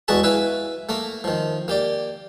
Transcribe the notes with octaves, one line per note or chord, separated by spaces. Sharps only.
E2 G#3 F#4 G#4 A5 B5
E4 B4 E5 F5 G#5
A3 A#3 A#4
D#3 F3
A#3 G4 D5